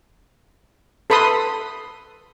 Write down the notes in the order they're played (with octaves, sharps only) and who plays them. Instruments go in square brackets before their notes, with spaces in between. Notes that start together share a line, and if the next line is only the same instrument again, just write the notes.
[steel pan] A4 B4 B5 C6 D#6